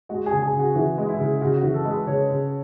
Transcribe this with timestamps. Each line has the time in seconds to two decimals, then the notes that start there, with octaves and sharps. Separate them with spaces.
0.09 G#3 F#4
0.26 G#4
0.32 C#3
0.42 G#4
0.54 C#3
0.59 F#4
0.75 E3 F#4
0.98 G#3
1.09 E4
1.19 C#3
1.41 C#3 F#4
1.57 F#4
1.63 E3
1.74 A4
1.85 G#3
1.90 B4
2.06 C#3 C#5
2.30 C#3